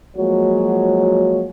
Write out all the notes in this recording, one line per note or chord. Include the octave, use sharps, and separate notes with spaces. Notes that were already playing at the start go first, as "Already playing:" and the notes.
F3 F#3 G#3 A#3 F#4 C#5